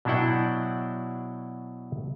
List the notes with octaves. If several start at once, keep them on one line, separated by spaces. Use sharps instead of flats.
B2 F#3 D4 E4 F#5 G5